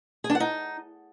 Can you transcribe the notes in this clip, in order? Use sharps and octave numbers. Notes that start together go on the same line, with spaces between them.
G#4
D4
F#5
D#4